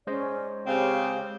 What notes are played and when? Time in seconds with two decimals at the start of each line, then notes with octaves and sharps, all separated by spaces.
0.07 G#3 C#4 C5 D5 D#5
0.67 C#3 C4 G4 C#5 F5